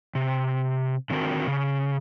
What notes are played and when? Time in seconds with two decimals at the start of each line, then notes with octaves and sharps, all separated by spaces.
0.15 C3
1.10 D3 D#3 C4 F#4 A#4
1.48 C#3